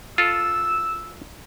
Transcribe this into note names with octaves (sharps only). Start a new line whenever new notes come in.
F4 A4 E6